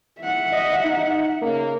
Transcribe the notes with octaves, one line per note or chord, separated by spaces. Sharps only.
E5 F#5
D#5
D#4
C#3 A#3